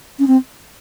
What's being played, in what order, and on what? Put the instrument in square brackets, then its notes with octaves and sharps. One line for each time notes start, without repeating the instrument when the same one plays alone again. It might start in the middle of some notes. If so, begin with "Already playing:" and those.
[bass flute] C#4
C4